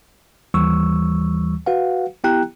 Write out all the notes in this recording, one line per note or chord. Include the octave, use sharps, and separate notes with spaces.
D#2 E3 G3 C#6 E6
F#4 B4 F5 F#5
B3 E4 G4 G5 A#5 F#6